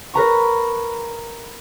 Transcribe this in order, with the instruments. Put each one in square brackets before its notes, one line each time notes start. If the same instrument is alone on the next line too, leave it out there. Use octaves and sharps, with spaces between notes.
[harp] A#4 B4 A#5 C#6